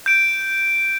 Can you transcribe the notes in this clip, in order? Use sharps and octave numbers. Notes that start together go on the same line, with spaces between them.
G6 D7